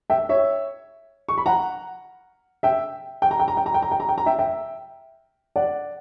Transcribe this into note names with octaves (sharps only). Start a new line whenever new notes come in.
E5 G5
C#5 E5
C#6
B5
F#5 A#5
E5 G5
G5
A#5
G5
A#5
G5
A#5
G5
A#5
G5
A#5
G5
A#5
E5 G5
E5 G5
D5 F#5